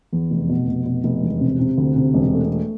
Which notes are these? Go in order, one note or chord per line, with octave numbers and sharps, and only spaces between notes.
E2
F1
B2
F1
B2
F1
E1
C3
C3
D2
C3
E1
A3
A3